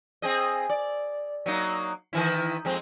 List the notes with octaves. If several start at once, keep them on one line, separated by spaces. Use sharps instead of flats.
C4 G#4 D#5
D5
F#3 A#3 D#4
D#3 E3 E4
F2 G#3 C4